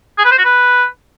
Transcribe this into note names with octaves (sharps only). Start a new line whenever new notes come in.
G#4
B4
C5
F#4
B4